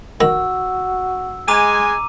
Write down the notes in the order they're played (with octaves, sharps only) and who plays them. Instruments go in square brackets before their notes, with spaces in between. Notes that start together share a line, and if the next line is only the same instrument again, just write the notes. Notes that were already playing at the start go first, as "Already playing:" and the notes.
[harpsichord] D#3 [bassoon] F#4 [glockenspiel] E6
[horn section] G#3 G#5 [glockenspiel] A#5 D6 D#7